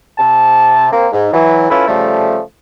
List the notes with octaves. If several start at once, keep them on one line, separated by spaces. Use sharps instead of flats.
C3 A5
A#3 C4
G#2
E3 F#3
C#4 E4 F4 A4 B4
C#3 F3 G3 A3